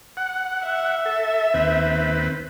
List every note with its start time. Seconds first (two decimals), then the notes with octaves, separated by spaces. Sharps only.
0.17 F#5
0.64 E5
1.06 A4
1.54 D#2 C4 B4